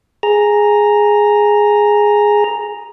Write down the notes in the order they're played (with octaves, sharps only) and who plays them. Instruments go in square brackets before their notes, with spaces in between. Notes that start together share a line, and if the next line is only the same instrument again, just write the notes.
[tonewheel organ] G#4 A#5